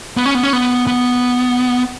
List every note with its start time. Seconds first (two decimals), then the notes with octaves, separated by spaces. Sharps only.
0.17 B3
0.26 C#4
0.35 B3
0.43 C#4
0.53 B3
0.87 B3